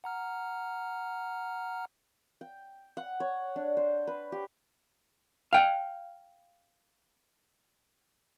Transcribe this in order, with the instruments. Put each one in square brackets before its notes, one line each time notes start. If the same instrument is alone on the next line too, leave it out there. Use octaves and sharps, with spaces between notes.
[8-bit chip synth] F#5 A#5 F6
[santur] G5
F#5
C#5
D4
C5
B4
G4
[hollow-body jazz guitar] F5 G5